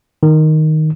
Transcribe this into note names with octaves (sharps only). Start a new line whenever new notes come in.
D#3